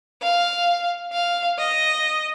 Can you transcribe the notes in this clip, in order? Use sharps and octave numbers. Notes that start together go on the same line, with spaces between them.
F5
F5
D#5